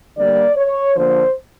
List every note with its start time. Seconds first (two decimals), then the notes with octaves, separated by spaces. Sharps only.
0.17 D3 G3 A#3 D5
0.56 C#5
0.95 D3 F3 A#3 C5